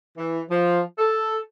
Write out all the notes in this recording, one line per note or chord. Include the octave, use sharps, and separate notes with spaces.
E3
F3
A4